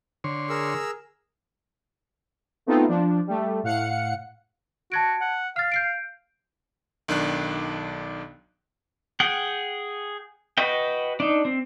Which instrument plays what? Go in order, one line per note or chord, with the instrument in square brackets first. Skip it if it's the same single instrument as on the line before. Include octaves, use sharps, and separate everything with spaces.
[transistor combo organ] D3 C#5 C6
[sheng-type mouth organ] G#4 A#4 E6
[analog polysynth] A3 B3 C4 D#4 F4
F3 D4
G3 A3
A2 F5 F#5 C#7
[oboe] F#4 [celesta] A5 G#6 D7
[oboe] F#5
[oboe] F5 [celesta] F6 A6
[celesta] G6 C7 D7
[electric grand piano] B1 D#3 D4 F#6
[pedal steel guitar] G#4 F#5 G5
F#4 B4 D#5 G5
D4 D#4
C4